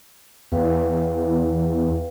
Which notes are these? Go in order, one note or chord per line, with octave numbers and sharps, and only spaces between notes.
E2 B4 F5 G5